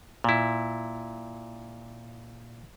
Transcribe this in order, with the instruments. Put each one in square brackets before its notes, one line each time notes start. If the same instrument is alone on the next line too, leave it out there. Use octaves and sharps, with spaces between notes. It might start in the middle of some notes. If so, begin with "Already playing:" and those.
[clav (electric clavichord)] A#2 E4